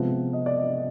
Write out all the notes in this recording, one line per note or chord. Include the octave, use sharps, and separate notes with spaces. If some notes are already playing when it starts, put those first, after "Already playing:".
Already playing: C3 F3 G#3 B3
D#5
D5
D#5